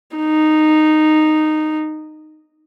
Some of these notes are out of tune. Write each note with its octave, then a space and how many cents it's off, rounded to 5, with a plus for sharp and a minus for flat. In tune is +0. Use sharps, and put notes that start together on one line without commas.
D#4 -10